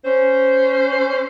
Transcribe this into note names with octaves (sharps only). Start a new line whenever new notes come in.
C#4 C5